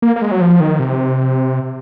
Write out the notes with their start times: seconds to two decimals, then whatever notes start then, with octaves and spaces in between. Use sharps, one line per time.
0.02 A#3
0.16 A#3
0.22 G#3
0.31 F#3
0.41 F3
0.60 D#3
0.79 C3